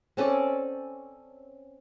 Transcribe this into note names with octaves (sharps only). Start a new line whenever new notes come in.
C4 C#4 A4 D5